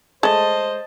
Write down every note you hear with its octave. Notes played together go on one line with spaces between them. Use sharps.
G#3 A3 C5 D#5 A5